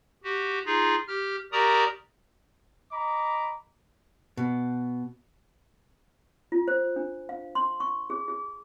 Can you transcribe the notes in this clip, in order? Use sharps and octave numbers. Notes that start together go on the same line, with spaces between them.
F#4 G4
D#4 F4 G#4
G4 F6
F#4 G4 A#4 D5 A#5 D#6
D#5 A#5 B5 D6
B2
F4
C5
D4
F5
C6
C#6
G#4
G#4